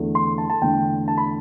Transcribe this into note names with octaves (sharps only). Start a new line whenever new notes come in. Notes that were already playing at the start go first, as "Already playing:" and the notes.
Already playing: E2 D3 A3
C6
A5
A5
E2 D3 A3 G5
A5
B5